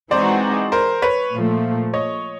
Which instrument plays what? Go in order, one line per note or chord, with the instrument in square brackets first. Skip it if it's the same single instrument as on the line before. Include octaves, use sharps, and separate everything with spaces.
[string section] E3 G#3 C4 D#4 F#4 [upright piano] C5 D5
[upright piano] A#4 C5
B4 C#5
[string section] A#2 F3 A3
[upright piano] C#5 D#5